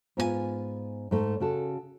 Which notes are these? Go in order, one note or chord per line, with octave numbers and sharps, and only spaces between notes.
G#2 B3 F4 F#4 G#5
G#2 A3
C#3 F#4 A4